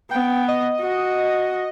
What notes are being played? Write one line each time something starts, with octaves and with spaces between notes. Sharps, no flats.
B3 G5
D#5
F#4